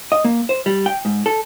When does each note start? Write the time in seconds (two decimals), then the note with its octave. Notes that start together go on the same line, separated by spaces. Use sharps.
0.12 D#5
0.25 A#3
0.49 C5
0.66 G3
0.86 G5
1.05 G#2
1.26 A4